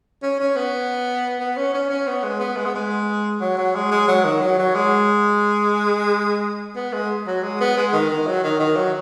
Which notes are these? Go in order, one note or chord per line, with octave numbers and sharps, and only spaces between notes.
C#4
C#4
B3
B3
C#4
C#4
C#4
B3
G#3
B3
G#3
B3
G#3
F#3
F#3
G#3
G#3
F#3
D#3
F#3
F#3
G#3
B3
G#3
F#3
G#3
B3
G#3
D#3
D#3
F#3
D#3
D#3
F#3